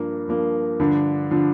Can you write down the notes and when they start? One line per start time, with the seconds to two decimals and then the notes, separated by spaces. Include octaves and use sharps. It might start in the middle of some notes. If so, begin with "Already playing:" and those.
Already playing: G2 F3 A#3
0.28 G2 F3 A#3
0.80 G2 D3 F3
1.31 D3 F3